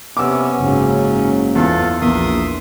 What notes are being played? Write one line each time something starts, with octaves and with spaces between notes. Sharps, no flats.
C3 B3 C#4 D6 E6
F#1 G#2 C#3 F#3
E2 F4 A4
A#1 E2 A#4 E5 C6 D#6